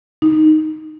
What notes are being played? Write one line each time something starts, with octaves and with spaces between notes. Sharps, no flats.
D#4